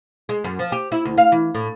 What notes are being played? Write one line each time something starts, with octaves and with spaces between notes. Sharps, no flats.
G#3
F#2
F3
G4
E4
D2
F5
E3
A2